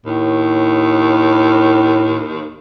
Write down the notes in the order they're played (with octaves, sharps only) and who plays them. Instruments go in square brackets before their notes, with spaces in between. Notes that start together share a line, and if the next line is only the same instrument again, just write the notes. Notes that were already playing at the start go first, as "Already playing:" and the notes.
[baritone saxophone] D#2 [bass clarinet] A2